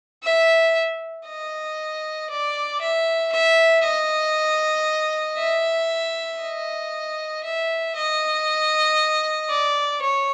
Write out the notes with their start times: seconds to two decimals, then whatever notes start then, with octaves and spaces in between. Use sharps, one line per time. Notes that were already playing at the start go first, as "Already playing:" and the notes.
0.24 E5
1.27 D#5
2.30 D5
2.81 E5
3.32 E5
3.84 D#5
5.38 E5
6.41 D#5
7.44 E5
7.96 D#5
9.50 D5
10.02 C#5